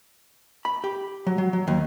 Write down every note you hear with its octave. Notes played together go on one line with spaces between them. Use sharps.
B5
G4
F#3
F#3
F#3
D#2